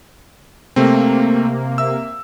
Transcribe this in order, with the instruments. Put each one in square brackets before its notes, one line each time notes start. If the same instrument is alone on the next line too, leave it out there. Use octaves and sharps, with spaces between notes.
[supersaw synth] C3 A#3 [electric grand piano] A3 C4
[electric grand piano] E5 E6